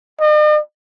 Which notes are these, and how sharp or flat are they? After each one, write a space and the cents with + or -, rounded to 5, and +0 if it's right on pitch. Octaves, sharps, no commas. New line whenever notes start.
D#5 -45